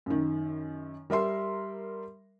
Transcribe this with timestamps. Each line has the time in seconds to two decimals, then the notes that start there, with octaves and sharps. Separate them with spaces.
0.06 F#2 D#3
1.10 G3 A#4 E5 C6